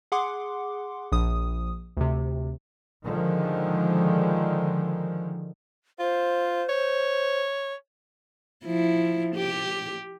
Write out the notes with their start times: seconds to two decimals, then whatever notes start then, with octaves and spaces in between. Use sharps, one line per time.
0.12 G#4 F#5 C6 D6
1.12 A#1 D#6
1.97 D2 C3
3.05 D3 D#3 F3 G#3
5.99 F4 C5
6.69 C#5
8.65 F3 E4
9.35 G4